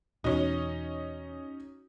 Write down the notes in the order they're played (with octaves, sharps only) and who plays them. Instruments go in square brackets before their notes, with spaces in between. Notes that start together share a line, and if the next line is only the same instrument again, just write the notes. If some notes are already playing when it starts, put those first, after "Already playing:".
[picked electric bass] E2 B2 [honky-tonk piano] C#4 D#4 [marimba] F#4